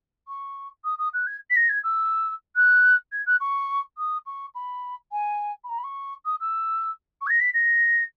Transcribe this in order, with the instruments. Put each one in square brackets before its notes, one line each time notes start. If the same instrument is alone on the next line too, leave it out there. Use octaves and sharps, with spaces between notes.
[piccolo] C#6
D#6
D#6
F#6
G#6
B6
A#6
G#6
E6
F#6
G#6
F#6
C#6
D#6
C#6
B5
G#5
B5
A#5
B5
C#6
D#6
E6
C#6
G#6
A#6
B6
A#6